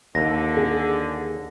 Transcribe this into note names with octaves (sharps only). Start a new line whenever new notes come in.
D#2 D3 A#6
G#4